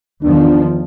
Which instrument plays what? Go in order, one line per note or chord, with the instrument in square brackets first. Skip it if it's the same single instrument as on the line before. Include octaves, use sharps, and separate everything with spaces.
[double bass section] E2 D#3 F3 [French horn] D4